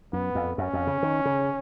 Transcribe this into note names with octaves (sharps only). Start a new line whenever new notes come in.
F#2 B3
F2
F#2 C#4
F2
C#3
D#3
C#3